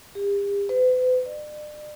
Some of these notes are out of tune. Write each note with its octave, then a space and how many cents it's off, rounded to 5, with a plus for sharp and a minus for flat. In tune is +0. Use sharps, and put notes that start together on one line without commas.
G4 +45
B4 +45
D5 +40